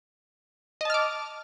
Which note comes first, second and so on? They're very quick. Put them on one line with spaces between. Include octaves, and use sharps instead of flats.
D#5 A5 F6 D6